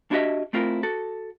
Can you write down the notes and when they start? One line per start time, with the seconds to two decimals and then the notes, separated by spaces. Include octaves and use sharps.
0.11 D4 E4 F#4 G4 D#5 E5
0.53 A3 C4 E4 F4 A#4
0.83 F#4 A4